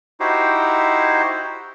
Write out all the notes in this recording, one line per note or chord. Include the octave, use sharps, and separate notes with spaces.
D#4 E4 F#4 G4 C5